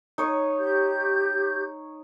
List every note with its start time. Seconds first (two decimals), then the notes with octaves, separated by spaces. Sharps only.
0.18 D#4 C#5
0.60 G4 G6